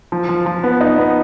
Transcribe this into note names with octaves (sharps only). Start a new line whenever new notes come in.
F3
F3
F3
B3
D#4
B3